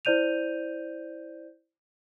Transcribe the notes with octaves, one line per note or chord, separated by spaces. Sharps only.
E4 C5 D5 G6 D#7 F7